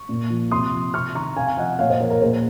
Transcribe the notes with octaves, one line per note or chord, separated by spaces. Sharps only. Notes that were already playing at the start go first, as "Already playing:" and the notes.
Already playing: C#6
A#2
F3
C3 C6 D#6
F3
C3 C#6 F6
D#3 A#5 C#6
C3 F5 G#5
G#5
F3 D#5 F#5
A#2 C#5 F5
C5 D#5
F3 A#4 C#5
A#4 C#5
A#2 G#4 C5